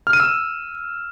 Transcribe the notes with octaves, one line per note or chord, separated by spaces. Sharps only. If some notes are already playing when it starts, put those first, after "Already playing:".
F6
D#7
E6